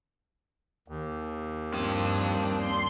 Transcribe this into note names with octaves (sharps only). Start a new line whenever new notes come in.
D#2
G2 A#3 C4 D4 F5
C6